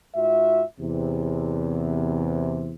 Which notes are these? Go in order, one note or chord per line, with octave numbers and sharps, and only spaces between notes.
G#2 F4 F#4 E5
E2 C3